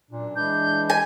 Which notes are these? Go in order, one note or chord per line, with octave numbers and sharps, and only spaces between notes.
F#2 A#2 D4
E3 G#3 D4 B4 G6
G#5